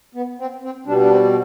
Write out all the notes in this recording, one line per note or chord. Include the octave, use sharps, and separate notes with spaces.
B3
C4
C4
B2 G3 D4
D4
C4